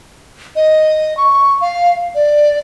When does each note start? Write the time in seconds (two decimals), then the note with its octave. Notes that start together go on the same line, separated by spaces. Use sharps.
0.56 D#5
1.17 C#6
1.61 F5
2.15 D5